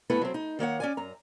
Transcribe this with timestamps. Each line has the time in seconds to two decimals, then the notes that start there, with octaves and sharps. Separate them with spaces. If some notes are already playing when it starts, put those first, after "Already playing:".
0.10 G2 A3 B3 E4 B4
0.22 F#3 C4
0.34 D#4
0.59 D#3 A#3 C#5 F#5
0.80 C#4 D5 G#5
0.97 F#2 A#5